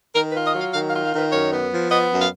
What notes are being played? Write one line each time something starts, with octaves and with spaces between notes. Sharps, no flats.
D#3 A#4
B4
F4
D#5
F#3
F5
D#3 F5
F5
F4
F5
D#3 B4
F#2 C#5
B3
F3
B3 D#5
F#2
F5